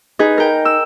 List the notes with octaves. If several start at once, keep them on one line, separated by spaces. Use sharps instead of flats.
D#4 G#4 B4
A#4 G5
E6